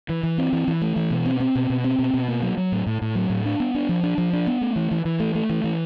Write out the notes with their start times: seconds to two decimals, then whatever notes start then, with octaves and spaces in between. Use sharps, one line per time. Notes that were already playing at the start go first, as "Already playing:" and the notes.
0.09 E3
0.23 E3
0.38 C4
0.53 E3
0.68 E3
0.82 A3
0.96 E3
1.11 B2
1.26 C4
1.40 C4
1.55 B2
1.70 B2
1.84 C4
1.99 B2
2.14 B2
2.28 A#3
2.42 F#3
2.57 F#3
2.72 A2
2.87 A2
3.02 A2
3.15 F#3
3.30 A2
3.46 D4
3.60 B3
3.75 D4
3.89 F3
4.03 D4
4.18 F3
4.33 D4
4.47 B3
4.61 A3
4.76 E3
4.91 E3
5.05 E3
5.20 A3
5.35 A3
5.49 E3
5.64 E3